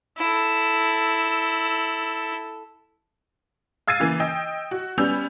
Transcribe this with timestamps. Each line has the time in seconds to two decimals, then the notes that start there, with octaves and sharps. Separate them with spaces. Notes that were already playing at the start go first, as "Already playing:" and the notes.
0.18 E4 A4
3.87 F5 E6 G#6 A6 C7 D#7
4.00 C#3 E3 A#3
4.20 D#5 G5 E6
4.71 F#4
4.98 G3 B3 C#4 E6 G6 F7